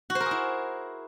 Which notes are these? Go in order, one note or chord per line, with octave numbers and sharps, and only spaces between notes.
F#4
C5
A#4
G#4
E4